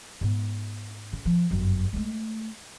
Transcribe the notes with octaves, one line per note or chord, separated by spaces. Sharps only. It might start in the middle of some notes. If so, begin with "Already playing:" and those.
G#2 B3
C#3
F3
G1 F#2
G#3 A3